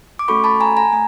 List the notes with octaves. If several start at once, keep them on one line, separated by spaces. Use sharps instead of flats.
D6
A3 C#4 F#4 A4 B5 C#6
A5 B5
G#5 A#5
G#5 A#5
A3 G#5